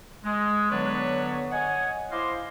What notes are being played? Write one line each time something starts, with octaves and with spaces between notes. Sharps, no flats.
G#3
D3 F#3 B3 D4 B4 C#5
C#5 D#5 F#5 G#5
E4 C5 D#5 F5 C6 D6